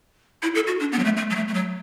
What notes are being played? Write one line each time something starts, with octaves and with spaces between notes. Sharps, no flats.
E4
A4
F#4
D4
B3
F#3
A3
A3
F#3
A3
A3
F#3